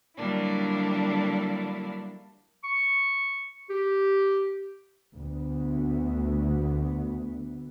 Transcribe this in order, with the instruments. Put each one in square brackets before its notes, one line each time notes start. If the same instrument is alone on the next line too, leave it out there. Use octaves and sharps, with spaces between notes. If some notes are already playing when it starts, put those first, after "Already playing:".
[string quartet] D3 F#3 G3 A#3 D4 E4
[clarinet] C#6
G4
[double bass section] D2 B3